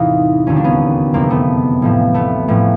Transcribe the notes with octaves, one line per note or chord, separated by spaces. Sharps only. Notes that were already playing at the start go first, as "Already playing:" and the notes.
Already playing: E2 A2 C3 E3 D#4 F4
E1 D#2 D3 C#4
D4
B3 C#4
F#1 F2 C3 A#3 C4
A3 B3
A1 A2 F3
A3 B3
A1 A2 F3